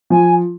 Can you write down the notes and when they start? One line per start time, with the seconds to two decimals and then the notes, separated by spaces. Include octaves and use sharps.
0.10 F3 G#5